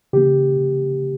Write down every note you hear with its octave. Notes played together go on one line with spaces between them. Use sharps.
C#3 E3 A#3 G4